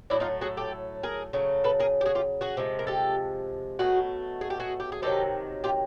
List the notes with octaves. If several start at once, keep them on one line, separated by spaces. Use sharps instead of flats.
A2 F#3 A3 D4 E4
D#4 F4
F#4 G#4
G4 A4
G#4 A#4
C#3 F#3 A3
A4 B4
G#4 A#4
G4
F#4 G#4
F4 G4
F#4 G#4
C3 F3 G#3
A#4
G4 A4
B2 F#3 A3 F#4 G#4
G#4
G4
F#4 G#4
G4
G#4
C3 D#3 F#3 G4 A4
F4 G4